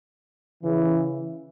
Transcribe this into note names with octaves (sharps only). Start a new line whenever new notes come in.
C#3 E3